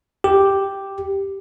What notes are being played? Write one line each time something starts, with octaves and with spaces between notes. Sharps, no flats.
G4